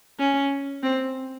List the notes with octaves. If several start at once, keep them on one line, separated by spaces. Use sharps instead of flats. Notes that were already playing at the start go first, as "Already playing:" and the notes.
C#4
C4